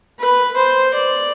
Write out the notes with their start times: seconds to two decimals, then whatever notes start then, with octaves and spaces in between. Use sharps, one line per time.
0.20 B4
0.57 C5
0.94 D5